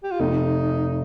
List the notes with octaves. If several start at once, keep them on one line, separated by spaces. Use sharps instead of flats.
G4
F4
F1 D#4